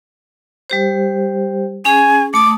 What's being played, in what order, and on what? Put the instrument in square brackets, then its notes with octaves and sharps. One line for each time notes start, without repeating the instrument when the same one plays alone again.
[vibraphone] G3 G4 C5
[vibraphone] C#4 G#4 [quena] G#5
[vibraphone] A3 A5 D#6 [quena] D6